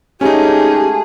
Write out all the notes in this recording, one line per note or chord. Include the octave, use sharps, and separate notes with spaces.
G#3 A3 C#4 D#4 G4 G#4